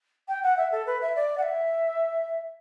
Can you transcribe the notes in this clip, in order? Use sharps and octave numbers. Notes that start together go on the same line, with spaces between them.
G5
F#5
E5
A4
B4
E5
D5
F#5
E5